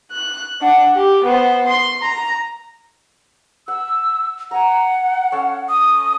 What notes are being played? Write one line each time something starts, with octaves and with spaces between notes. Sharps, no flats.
F#6
D4 F#5
G4
B3 C5
C6
A#5
F#5 E6
F#5 G#5 A#5
C#4 A4 F5
D#6